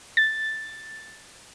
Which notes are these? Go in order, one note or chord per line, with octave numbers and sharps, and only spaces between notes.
A6